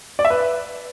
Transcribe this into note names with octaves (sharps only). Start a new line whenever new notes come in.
D5
E5
B4